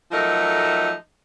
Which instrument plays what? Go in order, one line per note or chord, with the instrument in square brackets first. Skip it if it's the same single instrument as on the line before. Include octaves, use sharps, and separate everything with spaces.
[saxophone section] F3 F#3 A3 D#4 A4 A#4